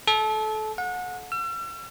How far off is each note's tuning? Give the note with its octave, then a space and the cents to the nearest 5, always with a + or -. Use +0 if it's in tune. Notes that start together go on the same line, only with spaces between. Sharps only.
A4 -25
F#5 -30
E6 +45